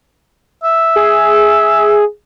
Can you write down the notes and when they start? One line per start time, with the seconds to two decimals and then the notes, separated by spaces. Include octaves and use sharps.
0.64 E5
0.96 G#4